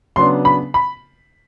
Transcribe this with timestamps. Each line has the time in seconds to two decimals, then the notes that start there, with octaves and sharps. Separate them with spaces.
0.16 C#3 F#3 B3 D4 C6
0.45 B5
0.74 B5